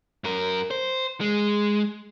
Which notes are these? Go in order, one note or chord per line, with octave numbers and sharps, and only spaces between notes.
F#2 A#4
C5
G#3